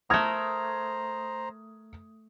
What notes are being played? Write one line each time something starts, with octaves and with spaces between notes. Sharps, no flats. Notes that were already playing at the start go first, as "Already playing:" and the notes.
A3 A#4 C5 A#5 D#6 G#6